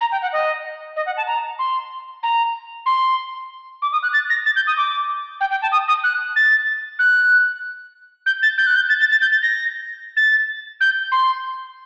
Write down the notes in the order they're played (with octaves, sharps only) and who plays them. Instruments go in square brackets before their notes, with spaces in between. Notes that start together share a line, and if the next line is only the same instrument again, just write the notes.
[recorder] A#5
G5
F#5
D#5
D#5
F#5
A5
A#5
C6
A#5
C6
D6
D#6
F#6
A6
A#6
A6
G6
D#6
D6
G5
G5
A5
D#6
D#6
F#6
A6
F#6
G6
A6
G6
F#6
G6
A6
A6
A6
G6
A6
A#6
A6
G6
C6